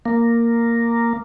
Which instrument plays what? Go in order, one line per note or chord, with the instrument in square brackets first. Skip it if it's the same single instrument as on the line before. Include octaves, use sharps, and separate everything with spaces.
[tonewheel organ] A#3